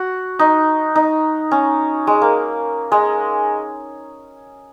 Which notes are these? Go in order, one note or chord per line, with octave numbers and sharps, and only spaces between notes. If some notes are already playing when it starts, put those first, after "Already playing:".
Already playing: F#4
D#4
D#4
C#4
G#3
A#3
G#3